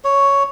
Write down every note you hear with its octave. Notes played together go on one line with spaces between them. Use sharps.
C#5